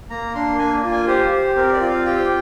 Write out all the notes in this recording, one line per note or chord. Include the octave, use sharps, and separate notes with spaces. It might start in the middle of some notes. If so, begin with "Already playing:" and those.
A#3 A#5
D4 C6
A#3 G#5
F4
G#5
G4 C5
G4
C4 A#4
D5
F4
F5
G4 G5